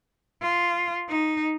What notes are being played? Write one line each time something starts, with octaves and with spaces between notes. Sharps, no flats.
F4
D#4